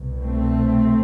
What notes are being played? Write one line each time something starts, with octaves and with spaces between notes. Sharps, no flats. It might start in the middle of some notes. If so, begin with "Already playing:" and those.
Already playing: C2 B2
A3 C4